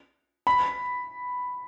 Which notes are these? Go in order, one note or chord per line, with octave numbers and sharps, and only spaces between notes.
B5